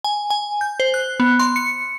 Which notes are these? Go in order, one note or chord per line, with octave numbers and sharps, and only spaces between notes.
G#5
G#5
G6
C5
F#6
B3
C6
C#7